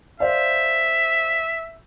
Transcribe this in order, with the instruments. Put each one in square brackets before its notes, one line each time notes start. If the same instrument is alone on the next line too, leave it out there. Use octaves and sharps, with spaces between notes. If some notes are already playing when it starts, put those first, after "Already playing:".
[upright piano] C5 D5 F5 [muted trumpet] E5